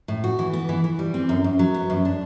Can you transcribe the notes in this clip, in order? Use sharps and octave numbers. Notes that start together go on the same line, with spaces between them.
A2
F#4
E3
B3
E3
E3
G3
C4
F#2
F#2
F#3
B3
F#2
D4